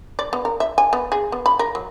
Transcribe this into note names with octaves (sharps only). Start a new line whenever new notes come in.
D5
B3
A#4
E5
G#5
B3
G#4
B3
B5
A#4
F#3